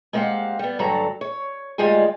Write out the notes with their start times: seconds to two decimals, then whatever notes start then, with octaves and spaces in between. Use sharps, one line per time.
0.13 G#3 A#3 C4 G4 F5 F#5
0.59 G3 B3
0.79 G2 D3 F#3 A4 A#5
1.21 C#5
1.78 D2 G#2 G3 G#3 F4 G#5